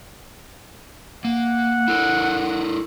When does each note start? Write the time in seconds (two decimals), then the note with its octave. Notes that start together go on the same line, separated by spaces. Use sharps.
1.25 A#3 F#5
1.88 E4 A4 A#4